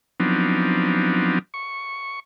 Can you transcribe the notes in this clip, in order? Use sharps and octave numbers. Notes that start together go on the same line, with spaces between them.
F3 F#3 B3 C4 D4 D#4
C#6